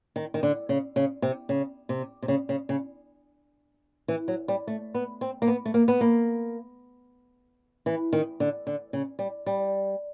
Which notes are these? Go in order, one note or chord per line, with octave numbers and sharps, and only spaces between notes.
D#3
D#3
D3
C#3
C#3
C3
C#3
C3
C3
C#3
C#3
C#3
E3
F#3
G3
A3
B3
C4
A#3
B3
A3
A#3
B3
A#3
E3
D#3
D3
D3
C#3
G3
G3